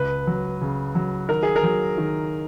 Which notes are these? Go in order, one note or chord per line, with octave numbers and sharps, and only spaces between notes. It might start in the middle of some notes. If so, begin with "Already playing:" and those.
Already playing: C#2 B4
F#3
C#3
F#3
D#3 A#4
G#4
A#4
F#3
D#3